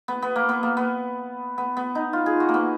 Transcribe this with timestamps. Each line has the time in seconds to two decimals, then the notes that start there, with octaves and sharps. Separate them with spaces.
0.08 B3
0.22 B3
0.36 A#3
0.49 B3
0.63 A#3
0.77 B3
1.58 B3
1.77 B3
1.95 D#4
2.13 F4
2.26 G#4
2.40 F#4
2.49 A#3
2.54 B3